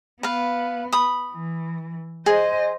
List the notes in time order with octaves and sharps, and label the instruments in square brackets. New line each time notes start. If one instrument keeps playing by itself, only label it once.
[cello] B3 [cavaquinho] B4 F5
[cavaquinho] B5 D#6
[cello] E3
[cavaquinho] G#4 [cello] C5 D#5